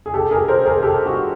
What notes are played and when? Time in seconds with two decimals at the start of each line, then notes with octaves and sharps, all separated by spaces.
0.06 G#4
0.14 G4 A4
0.31 G#4 A#4
0.48 A#4 C5
0.66 G#4 A#4
0.83 G4 A4
1.06 F#4 G#4